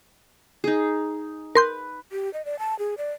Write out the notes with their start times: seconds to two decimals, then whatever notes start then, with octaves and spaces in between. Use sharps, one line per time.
0.64 D#4 G#4
1.55 A#4 B4 C6 G6
2.12 G4
2.34 D#5
2.45 D5
2.59 A5
2.79 G#4
2.98 D5